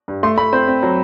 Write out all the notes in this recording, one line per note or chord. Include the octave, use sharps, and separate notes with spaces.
G2
A3 C6
A3 B5
C4 C5
C4
F#3